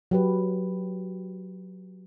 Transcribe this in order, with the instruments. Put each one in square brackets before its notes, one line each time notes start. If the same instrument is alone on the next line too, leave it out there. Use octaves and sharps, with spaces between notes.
[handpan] F#3 G4 B4